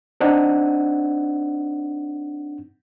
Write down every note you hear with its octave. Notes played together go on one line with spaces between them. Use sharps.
C4 D4 D#4 F#5